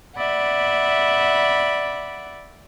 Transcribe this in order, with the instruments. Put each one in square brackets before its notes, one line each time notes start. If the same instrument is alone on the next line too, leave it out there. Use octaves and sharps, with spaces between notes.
[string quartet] D5 E5 F#5 B5